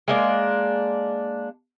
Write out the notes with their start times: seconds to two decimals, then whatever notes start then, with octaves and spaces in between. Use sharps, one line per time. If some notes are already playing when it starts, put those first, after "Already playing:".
0.08 G#3 A#3 D4